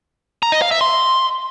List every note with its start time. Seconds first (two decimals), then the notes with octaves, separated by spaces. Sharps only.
0.43 A#5
0.52 D#5
0.62 F5
0.71 E5
0.81 C6